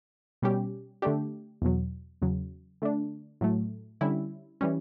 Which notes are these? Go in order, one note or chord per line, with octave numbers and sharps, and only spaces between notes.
B2 G3 C#4 G4
D3 A3 D4 G4
E2 B2 F#3
E2 C#3 F#3
D3 A3 D4
A2 F#3 A3
D3 G3 C#4 E4
E3 G3 C#4